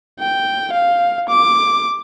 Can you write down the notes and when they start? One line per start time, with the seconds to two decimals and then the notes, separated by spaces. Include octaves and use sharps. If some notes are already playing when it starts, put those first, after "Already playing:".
0.20 G5
0.73 F5
1.29 D6